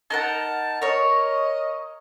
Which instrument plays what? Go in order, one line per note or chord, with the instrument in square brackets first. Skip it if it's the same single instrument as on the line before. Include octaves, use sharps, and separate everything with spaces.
[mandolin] D#4 A#4 F#5 [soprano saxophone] A5
[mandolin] A#4 C#5 [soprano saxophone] D#5